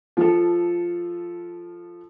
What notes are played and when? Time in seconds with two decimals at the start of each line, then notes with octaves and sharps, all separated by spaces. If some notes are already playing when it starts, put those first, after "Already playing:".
0.17 F3 F4 A4